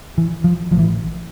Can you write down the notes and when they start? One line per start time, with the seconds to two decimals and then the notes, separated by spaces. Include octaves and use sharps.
0.18 E3
0.44 F3
0.71 A1 A2 F3
0.79 E3